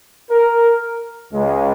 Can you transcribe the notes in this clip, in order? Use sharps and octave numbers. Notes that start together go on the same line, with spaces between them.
A#4
C#2 C#3 G#3